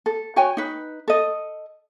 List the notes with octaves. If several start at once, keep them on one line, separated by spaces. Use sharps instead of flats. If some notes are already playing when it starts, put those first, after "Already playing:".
A4
F#4 C#5 G5 G#5
D#4 B4
A4 D#5